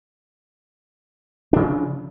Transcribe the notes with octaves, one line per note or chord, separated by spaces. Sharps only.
C#3 F3 D4